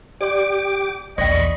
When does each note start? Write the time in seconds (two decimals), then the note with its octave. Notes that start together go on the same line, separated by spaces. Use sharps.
0.21 G4 D5 C6 D6
1.18 A#1 E2 D5 D#5 G5 B5 C#6